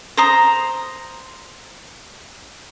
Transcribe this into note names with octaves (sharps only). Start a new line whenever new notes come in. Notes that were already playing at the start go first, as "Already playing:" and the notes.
C5 A#5 D#6